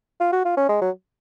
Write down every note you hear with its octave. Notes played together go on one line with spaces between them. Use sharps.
F4
F#4
F4
C#4
G#3
F#3